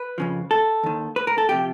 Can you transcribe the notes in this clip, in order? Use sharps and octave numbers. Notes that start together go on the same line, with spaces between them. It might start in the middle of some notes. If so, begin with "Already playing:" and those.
Already playing: B4
F2 C#3 F3
A4
D#2 D#3
B4
A#4
A4
C3 F3 G4